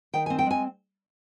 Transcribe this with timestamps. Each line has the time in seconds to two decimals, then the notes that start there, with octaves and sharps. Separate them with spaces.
0.14 D#3 G5
0.26 C4 G#5
0.39 G5
0.47 G#3 G#5